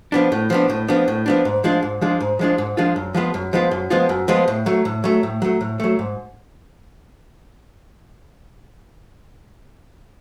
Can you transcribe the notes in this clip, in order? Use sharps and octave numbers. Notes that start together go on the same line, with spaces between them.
F3 B3 D4
A2
F3 B3 D4
A2
F3 B3 D4
A2
F3 B3 D4
G#2
F3 G#3 D4 F4
G#2
F3 G#3 D4 F4
G#2
F3 G#3 D4 F4
G#2
F3 G#3 D4 F4
F#2
F3 G#3 B3 F4
F#2
F3 G#3 B3 F4
F#2
F3 G#3 B3 F4
F#2
F3 G#3 B3 F4
A2
F#3 A3
A2
F#3 A3
A2
F#3 A3
A2
F#3 A3
G#2